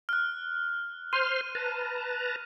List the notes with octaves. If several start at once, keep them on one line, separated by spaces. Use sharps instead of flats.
F6 F#6
C5 C6 F6 D#7
B4 A5 A#5